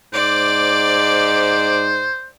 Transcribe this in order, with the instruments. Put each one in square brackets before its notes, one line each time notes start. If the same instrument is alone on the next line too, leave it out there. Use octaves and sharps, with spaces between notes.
[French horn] G#2 [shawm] C5 [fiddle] D5 D6